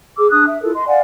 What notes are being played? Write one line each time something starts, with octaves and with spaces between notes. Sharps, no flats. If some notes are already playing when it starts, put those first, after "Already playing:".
G#4 D6 E6
D4 D#6 F#6
E5
E4 F4 A4 A#4
D#5 C6
D5 F5 F#5 G#5